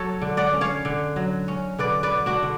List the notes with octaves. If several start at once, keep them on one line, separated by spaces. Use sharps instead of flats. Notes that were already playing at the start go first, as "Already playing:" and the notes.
Already playing: F#3 A4 C#5
D3
D5 F#5
C#4
C#5 F5
D3
F#3
C#4
D3 B4 D5
B4 D5
D3
D4 F#4
D3